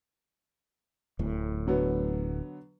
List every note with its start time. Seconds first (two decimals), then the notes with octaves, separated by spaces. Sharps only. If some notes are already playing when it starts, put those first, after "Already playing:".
1.19 D1 A2
1.67 D3 F#3 B3